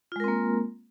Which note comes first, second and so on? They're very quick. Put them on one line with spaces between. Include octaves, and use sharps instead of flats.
F4 G#3 A#4 C4 A#3